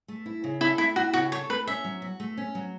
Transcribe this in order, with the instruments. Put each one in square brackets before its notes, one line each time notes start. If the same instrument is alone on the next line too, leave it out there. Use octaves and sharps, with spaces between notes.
[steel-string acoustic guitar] A3
E4
C#3
[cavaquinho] E4 [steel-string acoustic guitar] A4
[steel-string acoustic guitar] A3 [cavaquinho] E4
[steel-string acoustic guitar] E4 [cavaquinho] F#4
[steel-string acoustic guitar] C#3 [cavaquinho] F#4
[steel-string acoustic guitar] A4 [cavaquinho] C#5
[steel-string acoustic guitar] A3 [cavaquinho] B4
[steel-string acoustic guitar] C#4 [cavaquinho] E5
[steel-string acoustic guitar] F#3
F#4
A3
C#4
F#3